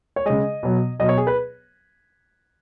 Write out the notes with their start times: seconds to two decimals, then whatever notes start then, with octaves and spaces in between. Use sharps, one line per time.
0.16 C#5
0.26 C#3 G#3 D#5
0.63 B2 F#3
0.99 B2 F#3 D#5
1.09 C#5
1.18 G#4
1.27 B4